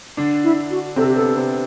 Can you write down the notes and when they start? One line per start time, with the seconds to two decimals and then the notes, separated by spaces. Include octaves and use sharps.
0.17 D3 D4
0.43 E4
0.70 F#4
0.96 C3 C4 A4
1.07 G4
1.15 B3 A4
1.36 C3 C4